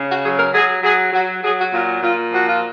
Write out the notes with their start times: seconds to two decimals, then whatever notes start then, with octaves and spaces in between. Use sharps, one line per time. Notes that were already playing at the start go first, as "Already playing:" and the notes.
Already playing: C#3
0.08 F#4
0.23 F#3 G#4
0.38 A#4
0.53 F#3 G#4
0.83 F#3 G#4
1.13 F#3 F#4
1.43 F#3 G#4
1.58 F#4
1.72 A#2 F4
2.02 A#2 F4
2.32 F3 F#4
2.45 F4